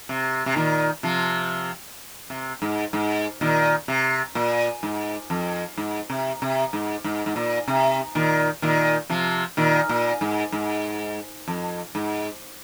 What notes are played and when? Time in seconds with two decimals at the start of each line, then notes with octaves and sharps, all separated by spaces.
0.09 C3
0.46 C3
0.56 A#2 D#3
1.03 C3 F3
2.30 C3
2.62 G#2
2.93 G#2
3.41 A#2 D#3
3.88 C3
4.35 A#2
4.83 G#2
5.30 F2
5.77 G#2
6.10 C3
6.42 C3
6.73 G#2
7.04 G#2
7.26 G#2
7.36 A#2
7.68 C3
8.15 A#2 D#3
8.62 A#2 D#3
9.09 C3 F3
9.57 A#2 D#3
9.89 A#2
10.21 G#2
10.52 G#2
11.48 F2
11.95 G#2